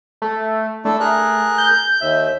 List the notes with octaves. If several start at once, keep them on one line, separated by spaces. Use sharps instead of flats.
A3
A3 D4 E4 A4
G#4 A#4 F#6
G6
D#2 E5